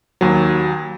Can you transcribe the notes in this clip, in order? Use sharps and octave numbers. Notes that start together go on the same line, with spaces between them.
D#2 F#3